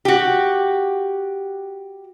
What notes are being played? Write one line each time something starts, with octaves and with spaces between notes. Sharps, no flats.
F#4 G4